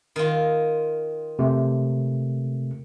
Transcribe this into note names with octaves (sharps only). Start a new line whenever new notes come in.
D#3 F4
C3 A3